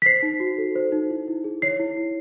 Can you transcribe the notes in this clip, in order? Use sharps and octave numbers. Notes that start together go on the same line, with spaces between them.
B6
C5 C7
D#4
F#4
A4
C5
D#4
E4
E4
G#4
C#5 C7
E4
E4